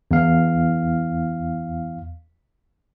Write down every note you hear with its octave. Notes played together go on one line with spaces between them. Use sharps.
E2 F5